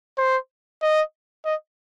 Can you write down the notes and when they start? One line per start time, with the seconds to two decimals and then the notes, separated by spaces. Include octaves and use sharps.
0.18 C5
0.82 D#5
1.45 D#5